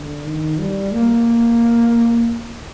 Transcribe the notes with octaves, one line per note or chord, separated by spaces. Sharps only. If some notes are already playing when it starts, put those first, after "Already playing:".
Already playing: D3
D#3
G3
A#3